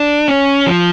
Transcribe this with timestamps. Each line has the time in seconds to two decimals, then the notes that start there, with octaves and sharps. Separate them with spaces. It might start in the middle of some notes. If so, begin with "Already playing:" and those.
Already playing: D4
0.28 C#4
0.66 F3